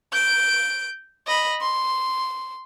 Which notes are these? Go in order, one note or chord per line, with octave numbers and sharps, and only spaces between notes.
G6 D7
D#5 B5
C6